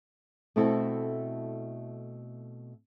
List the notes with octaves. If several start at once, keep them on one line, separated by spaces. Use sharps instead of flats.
B2 A3 C4 E4 A4